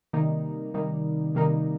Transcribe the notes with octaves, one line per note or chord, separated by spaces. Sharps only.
C3 D#3 G3 A#3 D#4
C3 D#3 G3 A#3 D#4
C3 D#3 G3 A#3 D#4